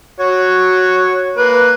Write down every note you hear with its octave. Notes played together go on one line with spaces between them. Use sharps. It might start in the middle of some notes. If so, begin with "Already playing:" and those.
F#4 C#5
A#3 B4